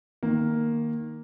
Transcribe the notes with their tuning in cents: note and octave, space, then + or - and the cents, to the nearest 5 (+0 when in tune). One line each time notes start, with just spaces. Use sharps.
D#3 -10 A#3 +0